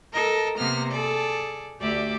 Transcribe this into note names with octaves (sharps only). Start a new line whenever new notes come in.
A4 A#4 D#5
C3 A#3 B3 F6 A#6
G#4 A4 D5
D2 G4 D5 E5 D6